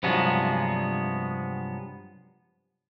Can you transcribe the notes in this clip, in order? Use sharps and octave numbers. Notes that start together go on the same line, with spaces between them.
G2 C3 F3 F#3 G#3 B3